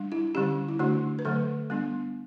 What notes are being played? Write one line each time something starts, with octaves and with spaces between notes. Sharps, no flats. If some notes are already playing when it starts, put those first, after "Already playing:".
Already playing: G3 D4
E4
D3 G3 C#4 G4
E4
D3 A3 D4 F#4
B4
D3 F#3 A3 A4
G3 B3 D4